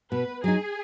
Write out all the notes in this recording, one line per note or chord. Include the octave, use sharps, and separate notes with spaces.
B2 B4
F#3 D#4 G#4